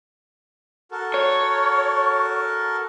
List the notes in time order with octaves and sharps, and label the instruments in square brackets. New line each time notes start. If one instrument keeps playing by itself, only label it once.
[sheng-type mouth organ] F#4 A4 A#4
[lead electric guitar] C#5